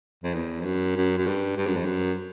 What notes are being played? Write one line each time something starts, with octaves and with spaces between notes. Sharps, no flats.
F2
E2
F2
F#2
F#2
F#2
G2
G2
F#2
F2
F#2